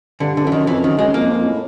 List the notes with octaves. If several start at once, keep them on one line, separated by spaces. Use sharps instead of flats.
G2 D3
D3
F#2 E3
D#3
F2 E3
F#2 D#3
F#2 G#3
F2 A#3
F2
A2